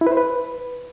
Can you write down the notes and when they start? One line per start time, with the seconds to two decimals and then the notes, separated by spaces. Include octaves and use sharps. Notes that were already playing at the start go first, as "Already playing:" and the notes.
0.01 E4
0.07 B4
0.12 C5
0.17 B4